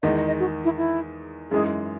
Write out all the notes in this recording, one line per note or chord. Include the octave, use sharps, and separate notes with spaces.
E2 D#3 G#3 D#4 D#5
D#5
D#5
F#4
E4
E4
F#2 E3 G#3 D#4 G#4